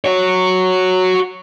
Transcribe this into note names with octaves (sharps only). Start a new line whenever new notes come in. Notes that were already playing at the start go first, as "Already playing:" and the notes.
F#4 C#5